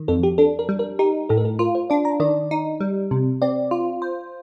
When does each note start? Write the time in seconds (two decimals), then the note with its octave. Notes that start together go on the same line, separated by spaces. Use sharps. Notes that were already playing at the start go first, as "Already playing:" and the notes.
Already playing: D#3
0.08 F2 A4
0.23 G4
0.38 D4 A4
0.59 A#4
0.69 G3
0.79 A#4
0.99 D#4 G4
1.29 A2 A4
1.38 A#4
1.45 A4
1.59 F4 A#4
1.75 C5
1.90 D4 D5
2.05 A#5
2.20 D#3 D5
2.51 D#4
2.81 G3
3.11 C3
3.42 C4 D5
3.71 F4
4.02 C5